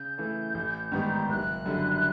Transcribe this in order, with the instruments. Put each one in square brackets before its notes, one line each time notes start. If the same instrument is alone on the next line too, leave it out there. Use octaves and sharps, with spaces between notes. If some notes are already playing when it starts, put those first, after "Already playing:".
Already playing: [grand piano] C#3 [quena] G6
[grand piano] E3 A3
A1
G#2 D#3 G3 B3
[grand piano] F#1 [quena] F#6
[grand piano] F#2 D3 G3